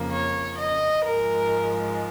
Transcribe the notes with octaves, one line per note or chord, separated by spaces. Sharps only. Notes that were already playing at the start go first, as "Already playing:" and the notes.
Already playing: F2 C#3 F3 A#3
C#5
D#5
G#2 F3 G#3 A#4